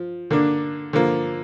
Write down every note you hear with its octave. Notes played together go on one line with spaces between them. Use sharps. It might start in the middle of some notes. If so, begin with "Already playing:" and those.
Already playing: F3
D3 A#3 D4
D3 F3 A#3